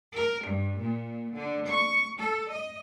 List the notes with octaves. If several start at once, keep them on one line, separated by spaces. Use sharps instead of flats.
A#4
G2
A#2
D3
C#6
A4
D#5